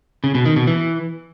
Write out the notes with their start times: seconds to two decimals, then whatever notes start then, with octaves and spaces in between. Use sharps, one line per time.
0.24 C#3
0.35 B2
0.45 D#3
0.56 B2
0.67 E3